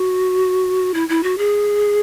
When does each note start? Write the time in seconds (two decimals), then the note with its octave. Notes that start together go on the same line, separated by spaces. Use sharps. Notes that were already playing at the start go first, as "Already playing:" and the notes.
Already playing: F#4
0.94 E4
1.09 E4
1.23 F#4
1.38 G#4